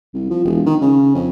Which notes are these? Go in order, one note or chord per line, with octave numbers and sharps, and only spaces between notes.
C2
F3
E1
D#3
C#3
F2